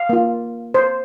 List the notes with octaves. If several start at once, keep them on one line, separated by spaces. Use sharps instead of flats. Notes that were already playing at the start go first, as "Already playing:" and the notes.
Already playing: F5
A#3 F4
C5